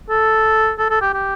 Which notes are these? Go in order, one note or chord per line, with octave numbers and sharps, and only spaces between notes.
A4
A4
A4
G4
G4